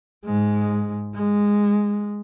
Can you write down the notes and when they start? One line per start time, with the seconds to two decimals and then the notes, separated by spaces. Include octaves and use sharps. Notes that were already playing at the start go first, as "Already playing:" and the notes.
0.25 G#2 G#3
1.15 G#3